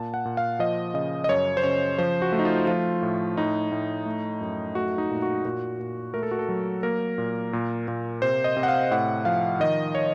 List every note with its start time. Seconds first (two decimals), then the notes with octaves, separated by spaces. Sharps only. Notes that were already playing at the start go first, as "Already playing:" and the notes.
Already playing: A#2 A5
0.14 F#5
0.25 A#2
0.37 F5
0.59 F3 D#5
0.94 C#3 D#5
1.24 D#5
1.29 F#2 C#5
1.57 C5
1.63 C#3 C#5
1.98 F3 C5
2.22 F#4
2.32 A3
2.39 D#4
2.45 F4
2.67 F3 F4
3.02 A2
3.37 A2 D#4
3.72 A2
4.06 A3
4.41 F#2
4.75 A3 F#4
4.98 D#4
5.10 A#2
5.22 F#4
5.45 A#2 F#4
5.79 A#2
6.14 A3 A#4
6.23 A4
6.31 F#4
6.39 A4
6.49 F#3
6.83 A#3 A#4
7.18 A#2
7.53 A#2
7.88 A#2
8.22 C3 C5
8.44 D#5
8.57 C3
8.63 F#5
8.68 F5
8.91 A2 F#5
9.25 F3 F5
9.60 D#3 D#5
9.95 C#5